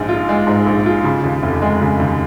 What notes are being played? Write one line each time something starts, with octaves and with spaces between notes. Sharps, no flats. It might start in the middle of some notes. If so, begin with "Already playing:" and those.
Already playing: A#1 G#2 G#3
F4
G#3
G#2
A#1
F4
C#3
D#2
F1
G#3
C#3
D#2